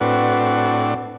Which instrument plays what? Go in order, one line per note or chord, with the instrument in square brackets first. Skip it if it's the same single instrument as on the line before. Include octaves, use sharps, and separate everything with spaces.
[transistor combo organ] A2 D4 [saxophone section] C4 F#4 B4